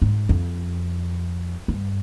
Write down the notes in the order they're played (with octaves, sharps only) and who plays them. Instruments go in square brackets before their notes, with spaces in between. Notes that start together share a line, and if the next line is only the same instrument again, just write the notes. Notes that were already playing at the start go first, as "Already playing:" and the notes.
[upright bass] G#2
F2
G2